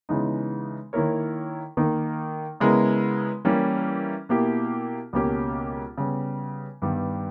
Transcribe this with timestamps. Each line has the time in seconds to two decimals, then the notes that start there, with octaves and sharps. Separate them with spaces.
0.09 C#3 E3 G#3 B3 D#4
0.93 D#3 A#3 E4 A#4 C#5
1.77 D#3 A#3 D#4
2.60 C#3 G#3 B3 E4 A#4
3.45 E3 G3 A#3 C#4 E4
4.29 B2 A#3 E4 G4
5.13 C#2 B2 A#3 C#4 G4
5.98 C#3 G3 B3
6.82 G2 D#3 G3 B3